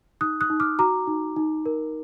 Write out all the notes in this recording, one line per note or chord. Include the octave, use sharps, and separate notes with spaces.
D#4 D#6 F#6
D#6 F#6
D#4
D6 F6
F#4 A#5 D6
D#4
D#4
A#4